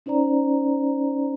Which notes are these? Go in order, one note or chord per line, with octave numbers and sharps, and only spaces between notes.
C#4 D#4 C5 D5 A#5